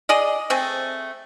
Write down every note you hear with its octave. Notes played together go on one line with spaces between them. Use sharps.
G#4 D5 D#5
A3 C4 G#4